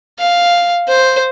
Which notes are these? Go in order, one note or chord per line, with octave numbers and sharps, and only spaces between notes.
F5
C5